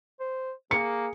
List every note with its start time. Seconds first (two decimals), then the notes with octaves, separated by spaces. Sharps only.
0.20 C5
0.71 A#3 G#4 C#7